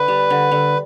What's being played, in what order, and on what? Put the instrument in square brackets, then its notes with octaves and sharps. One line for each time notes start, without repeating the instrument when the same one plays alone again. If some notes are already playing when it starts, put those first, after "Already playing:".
Already playing: [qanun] D3 [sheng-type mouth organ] B4
[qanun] G3
D3
D3